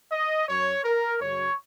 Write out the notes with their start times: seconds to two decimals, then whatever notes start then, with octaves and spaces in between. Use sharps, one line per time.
0.12 D#5
0.48 F#2 F#3 C#5
0.85 A#4
1.21 F#2 C#3 F#3 C#5